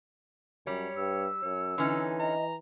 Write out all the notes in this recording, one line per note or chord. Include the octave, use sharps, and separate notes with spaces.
F#2 G3 C#5
G2 E6
F#2 C#5
D3 E3 C#4 D#4
D#5 A#5